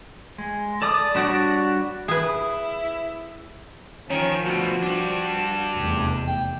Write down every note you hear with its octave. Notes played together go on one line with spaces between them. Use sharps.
G#3
A4 D5 D6 D#6
G3 D4 F#4 C#5 D5
E4 G#4 B4
D#3 F3 C#4
D2 B2 F#4
G3 D4
F1 E2
G5